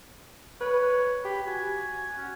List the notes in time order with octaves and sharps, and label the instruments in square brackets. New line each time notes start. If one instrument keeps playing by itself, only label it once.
[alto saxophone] B4 [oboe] C#5
[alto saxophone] G4 [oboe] B5
[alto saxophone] F#4 [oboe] G#5
[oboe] C#4